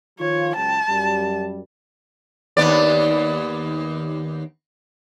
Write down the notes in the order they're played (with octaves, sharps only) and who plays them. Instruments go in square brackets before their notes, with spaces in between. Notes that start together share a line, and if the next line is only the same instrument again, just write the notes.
[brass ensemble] D#3 F3 F4 [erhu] C#5
[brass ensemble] C#2 F#3 G5 [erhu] A5
[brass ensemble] F#2 G3
[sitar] D#2 B3 D5